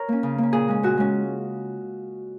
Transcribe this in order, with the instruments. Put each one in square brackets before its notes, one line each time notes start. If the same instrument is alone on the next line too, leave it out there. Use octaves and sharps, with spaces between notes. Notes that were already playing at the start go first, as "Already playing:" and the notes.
Already playing: [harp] A#4 C#5
A#3 C#4
C#3
A#3 C#4
A#2 G#4
G#3 C#4
A#2 F#4
G#3 C#4